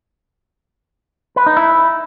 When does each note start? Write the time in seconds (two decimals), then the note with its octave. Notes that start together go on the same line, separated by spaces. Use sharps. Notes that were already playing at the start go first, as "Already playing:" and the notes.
1.36 B4
1.46 D#4
1.57 E4